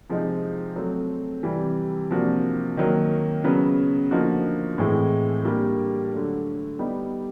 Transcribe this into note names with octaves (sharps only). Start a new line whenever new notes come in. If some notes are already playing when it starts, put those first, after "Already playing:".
C3 F3 G#3 C4 D#4
F#3 A3 C4
C3 E3 G3
C3 F3 A#3 D4 F#4
D#3 F#3 A#3
C#3 F#3 B3
D3 F3 A#3 D#4 F#4
A2 E3 G#3 C4
G3 A#3 D4 G4
D3 F#3 A3
G3 B3 D#4 G4